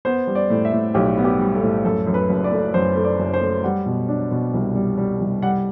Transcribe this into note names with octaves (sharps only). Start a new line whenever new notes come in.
B3 C5
G3
D5
A2
E5
A2
B1 G4
B3
G4
G3
A4
A2
F#2 A4
F#2
B4
F#1
D5
A3
F#2 C5
A3
D5
F#1
C5
A3
G3 F#5
B2
D4
B2
C2
G3
G3
C2
G3 F#5